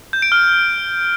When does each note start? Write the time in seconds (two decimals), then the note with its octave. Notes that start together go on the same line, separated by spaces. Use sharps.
0.13 G6
0.22 D7
0.32 F6